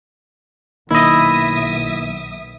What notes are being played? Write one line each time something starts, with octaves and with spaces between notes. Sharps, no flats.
B1 D#3 A#3 D#4 E4 D#5 E5 D#6